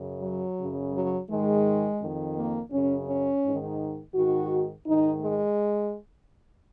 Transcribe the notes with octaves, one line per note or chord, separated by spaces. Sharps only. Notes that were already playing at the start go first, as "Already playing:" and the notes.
Already playing: F#2 C#3
F#3
F#2 C#3
F#3
G#2 D#3 G#3
F2 D#3
A#3
F#2 C#3 C#4
C#4
G#2 D#3
G#2 D#3 F#4
G#2 D#3 D#4
G#3